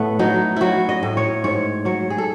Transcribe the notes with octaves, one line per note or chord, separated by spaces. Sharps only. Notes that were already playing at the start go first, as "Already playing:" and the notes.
Already playing: A2 A3 B3
F#3 D#4
F#3 E4 F#4
D#5
A2
C#5
G#2 C#5
F#3 C#5
G#4
A4